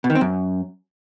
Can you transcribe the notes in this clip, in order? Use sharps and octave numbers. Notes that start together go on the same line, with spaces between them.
B2
D#3
C4
F#2